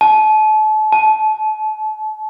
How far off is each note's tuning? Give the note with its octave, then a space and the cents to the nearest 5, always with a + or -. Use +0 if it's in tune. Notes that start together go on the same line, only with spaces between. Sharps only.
A5 -35
A5 -25